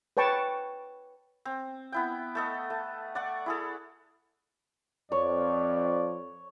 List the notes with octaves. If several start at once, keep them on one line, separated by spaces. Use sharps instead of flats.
B4 C#5 G5 A5 C#6
C4
B3 E4 G5
A3 A4 D#5
A3
D5 F#5 C#6
E4 G#4 A4
F2 C#5 D5